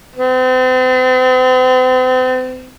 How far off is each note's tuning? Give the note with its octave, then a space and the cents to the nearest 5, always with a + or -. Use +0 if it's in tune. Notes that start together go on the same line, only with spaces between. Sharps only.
C4 -40